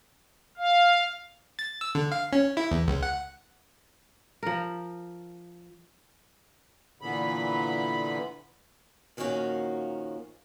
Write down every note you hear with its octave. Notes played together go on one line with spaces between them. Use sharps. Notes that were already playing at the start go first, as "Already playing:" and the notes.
F5
A6
E6
D3
F5
C#4
E4
E2
C#2
F#5
F3 A#4
A#2 D3 E3 B3 B5
A#2 D#3 F3 A#3 C#4 F#4